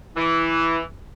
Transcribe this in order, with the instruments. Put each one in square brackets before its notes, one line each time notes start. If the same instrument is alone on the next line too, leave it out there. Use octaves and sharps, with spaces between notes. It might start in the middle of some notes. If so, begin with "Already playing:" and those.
[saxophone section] E3 [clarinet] E4